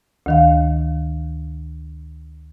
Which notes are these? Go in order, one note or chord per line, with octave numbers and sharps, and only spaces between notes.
D2 D#3 F5